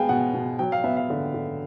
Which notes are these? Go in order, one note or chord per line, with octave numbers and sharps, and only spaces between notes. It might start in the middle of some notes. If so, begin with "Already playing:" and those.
Already playing: G#3 B3 F5 G5 G#5
B2 F#5
B2
F#3 G5
F5
B3 E5
F5
D3
D3